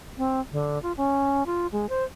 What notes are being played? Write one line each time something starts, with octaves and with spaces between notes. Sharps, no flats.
C4
D3
F4
C#4
F4
G#3
C5